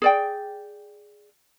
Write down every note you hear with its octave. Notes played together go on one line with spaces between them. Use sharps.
G#4 D5 G5